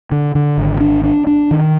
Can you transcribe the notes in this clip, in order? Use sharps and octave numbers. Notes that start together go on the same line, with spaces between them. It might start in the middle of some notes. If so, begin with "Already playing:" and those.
D3
D3
G#1
D4
D4
D4
D#3